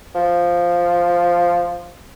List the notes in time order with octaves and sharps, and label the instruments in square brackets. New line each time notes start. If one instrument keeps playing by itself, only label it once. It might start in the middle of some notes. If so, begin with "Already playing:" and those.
[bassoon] F3